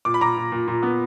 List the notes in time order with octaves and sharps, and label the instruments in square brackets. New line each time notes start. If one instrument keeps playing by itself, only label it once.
[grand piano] A#2 D6
B5
A#2 A#5 D6
A#2
A#2
A#2
B3